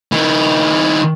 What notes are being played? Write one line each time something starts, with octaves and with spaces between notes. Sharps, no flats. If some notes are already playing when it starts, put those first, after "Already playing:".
D#3 E4